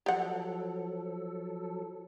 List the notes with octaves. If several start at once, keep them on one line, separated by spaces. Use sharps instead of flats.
F3 F#3 G4 A4 F#5